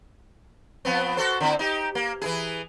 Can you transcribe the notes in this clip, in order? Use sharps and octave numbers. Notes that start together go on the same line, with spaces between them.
F3 B3 C4
F#4 A4 C5
D3 C4 E4
D#4 G4
A#3
E3 E4 G#4